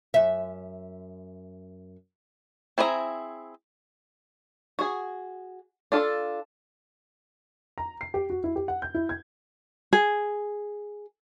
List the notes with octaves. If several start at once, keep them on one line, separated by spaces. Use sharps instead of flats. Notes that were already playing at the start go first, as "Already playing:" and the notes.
F#2 E5
C4 E4 G#4 D5 A#5
F#4 G#4
D4 F4 A4
A#5
C7
G4
F#4
E4
G4
F#5
G6
E4
G#6
G#4